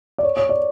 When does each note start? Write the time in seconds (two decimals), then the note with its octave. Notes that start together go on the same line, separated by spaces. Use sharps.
0.18 D5
0.23 C#5
0.37 C#5
0.49 D5